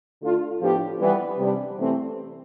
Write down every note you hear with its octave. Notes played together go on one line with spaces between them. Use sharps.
D3 A3 D4 F4
A2 F3 B3 D4 G4
E3 G3 B3
C3 G3 D4
C3 E3 A3 C4